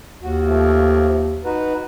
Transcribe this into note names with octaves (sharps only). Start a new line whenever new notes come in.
D#2 F#4
F3 A3
D#4 F#4 B4